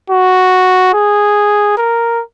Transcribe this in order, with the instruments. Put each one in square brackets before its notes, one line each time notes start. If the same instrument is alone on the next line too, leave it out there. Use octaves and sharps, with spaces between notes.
[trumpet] F#4
G#4
A#4